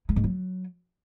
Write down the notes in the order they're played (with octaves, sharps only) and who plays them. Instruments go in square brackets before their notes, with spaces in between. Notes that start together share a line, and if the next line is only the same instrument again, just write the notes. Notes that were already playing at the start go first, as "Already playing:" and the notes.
[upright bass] G#3
G#2
F#3